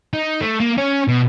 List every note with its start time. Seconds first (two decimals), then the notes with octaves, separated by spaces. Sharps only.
0.14 D#4
0.41 A3
0.60 A#3
0.77 C#4
1.08 B2